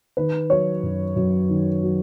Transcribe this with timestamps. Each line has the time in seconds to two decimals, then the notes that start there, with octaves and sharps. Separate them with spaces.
0.17 D#3 B4
0.50 F#3 C#5
0.83 F#2
1.16 F#2
1.49 D#3
1.83 F#3